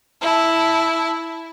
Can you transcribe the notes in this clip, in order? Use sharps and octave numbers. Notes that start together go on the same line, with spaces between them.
E4 A5